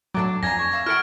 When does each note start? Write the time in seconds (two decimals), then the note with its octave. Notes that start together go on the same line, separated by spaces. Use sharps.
0.14 A2 F#3 D4 A5 D6
0.43 F2 D4 F5 G#5 A#5 G#6 A#6
0.59 G#5 C#6
0.71 E5 F5 A#5
0.86 E4 A4 F#5 F6 F#6 D7